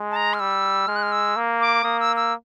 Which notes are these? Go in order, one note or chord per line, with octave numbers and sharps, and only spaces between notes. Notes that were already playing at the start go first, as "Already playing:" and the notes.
Already playing: G#3
A5
A#5
F6
G3 E6
G#3 F6
F#6
F6
E6
A#3
D6
A#3 D#6
E6
E6